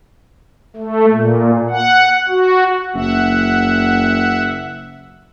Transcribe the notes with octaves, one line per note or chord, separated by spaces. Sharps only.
A3
A#2
F#5
F#4
F#1 E5 F#5